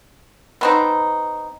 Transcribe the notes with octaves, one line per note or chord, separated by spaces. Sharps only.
B3 C4 D#4